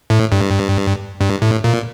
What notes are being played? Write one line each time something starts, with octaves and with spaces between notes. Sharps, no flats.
A2
G2
G2
A2
A#2